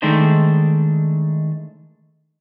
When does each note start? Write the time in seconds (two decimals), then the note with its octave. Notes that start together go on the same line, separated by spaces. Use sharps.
0.02 D#3 G#3 A3 D4 D#4 C5